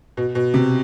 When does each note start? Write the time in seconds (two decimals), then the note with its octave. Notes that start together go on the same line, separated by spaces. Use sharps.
0.17 B2
0.35 B2
0.54 C3